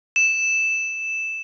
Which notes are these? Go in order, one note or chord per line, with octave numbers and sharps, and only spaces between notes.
E7